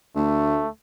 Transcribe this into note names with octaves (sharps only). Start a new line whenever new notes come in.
D2 A3